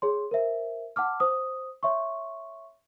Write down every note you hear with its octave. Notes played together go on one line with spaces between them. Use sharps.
G#4 C#5 C6
A#4 C5 E5
F#5 A5 D6 F6
C5 D#6
C#5 E5 C6 C#6